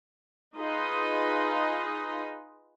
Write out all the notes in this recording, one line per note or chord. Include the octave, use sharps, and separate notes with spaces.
D#4 F4 G#4 B4 D#5